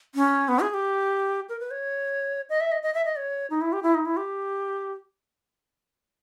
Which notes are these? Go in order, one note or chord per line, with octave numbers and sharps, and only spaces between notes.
C#4
B3
G#4
G#4
G4
A#4
B4
C#5
D#5
E5
D#5
D#5
E5
D#5
C#5
D#4
E4
G4
E4
D#4
E4
G4